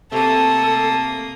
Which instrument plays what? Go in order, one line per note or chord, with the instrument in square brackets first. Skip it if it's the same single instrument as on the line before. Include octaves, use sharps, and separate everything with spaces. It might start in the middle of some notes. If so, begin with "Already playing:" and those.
[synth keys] C3 A3 C4 [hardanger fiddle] A#3 D#6 [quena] A4 [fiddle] A5